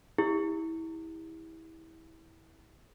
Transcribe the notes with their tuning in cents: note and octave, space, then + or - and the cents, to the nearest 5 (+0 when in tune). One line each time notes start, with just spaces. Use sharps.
E4 -25 G4 +30